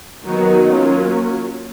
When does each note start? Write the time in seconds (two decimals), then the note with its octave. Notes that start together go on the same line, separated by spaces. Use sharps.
0.25 D#3 F#3 B3 D#4 F#4
0.69 F#3 A#3 C#4 F4